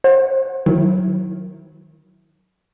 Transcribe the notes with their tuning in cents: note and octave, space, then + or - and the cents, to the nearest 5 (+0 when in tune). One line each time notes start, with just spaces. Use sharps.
C5 +35 F#5 -15
D#3 +0 F#3 +0 E4 +0